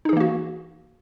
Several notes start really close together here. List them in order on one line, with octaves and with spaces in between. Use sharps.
D#4 G#4 E3 A#3 F#4